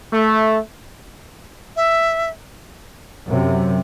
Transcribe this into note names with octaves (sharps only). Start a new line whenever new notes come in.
A3
E5
F#2 C3